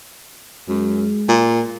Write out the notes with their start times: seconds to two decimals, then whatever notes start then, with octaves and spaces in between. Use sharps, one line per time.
0.68 F#2 G#3
1.29 A#2